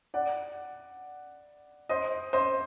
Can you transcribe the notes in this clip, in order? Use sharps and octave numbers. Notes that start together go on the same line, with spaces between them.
D5 F#5
C5 D#5
C5 D#5